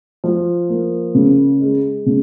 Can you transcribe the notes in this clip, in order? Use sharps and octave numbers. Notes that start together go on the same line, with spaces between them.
F3
A#3
C#3
G#3
C#3